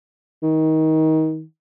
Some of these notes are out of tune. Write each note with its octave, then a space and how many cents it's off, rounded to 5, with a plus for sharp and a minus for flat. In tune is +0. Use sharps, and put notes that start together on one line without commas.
D#3 +25